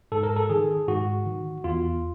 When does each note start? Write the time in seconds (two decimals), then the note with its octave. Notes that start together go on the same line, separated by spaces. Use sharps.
0.12 G#2 A4
0.23 A#4
0.36 A4
0.50 D#3 G#4
0.88 G#2 F#4
1.26 D#3
1.64 E2 F4